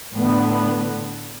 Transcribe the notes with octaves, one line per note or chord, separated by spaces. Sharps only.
A2 D3 B3